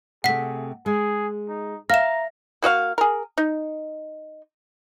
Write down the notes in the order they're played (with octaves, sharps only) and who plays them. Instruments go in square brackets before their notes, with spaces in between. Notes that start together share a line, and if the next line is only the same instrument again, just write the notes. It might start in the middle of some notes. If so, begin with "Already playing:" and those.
[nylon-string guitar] C3 A3 [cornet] G#4 [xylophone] F#5 B6
[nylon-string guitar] G#3 [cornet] G#4
[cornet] D#4
[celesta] E5 A#6 [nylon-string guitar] F5 [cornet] A#5 [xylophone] F6 E7
[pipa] A#3 F#4 D#5 F5
G#4 A#4
D#4